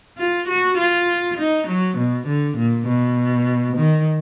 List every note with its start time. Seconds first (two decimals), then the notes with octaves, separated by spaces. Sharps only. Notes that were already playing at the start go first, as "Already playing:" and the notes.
0.18 F4
0.48 F#4
0.78 F4
1.38 D#4
1.68 F#3
1.98 B2
2.27 D3
2.58 A#2
2.87 B2
3.77 D#3